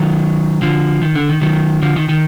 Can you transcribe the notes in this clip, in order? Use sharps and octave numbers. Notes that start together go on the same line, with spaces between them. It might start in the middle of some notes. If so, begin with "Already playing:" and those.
Already playing: D#3 F#3
D3 F3
D#3
D3
D#3
D#3 F#3
D3 F3
D#3
D#3